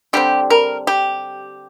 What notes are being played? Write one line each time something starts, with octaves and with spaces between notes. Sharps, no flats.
D3 G3 C4 G4
A#4
G4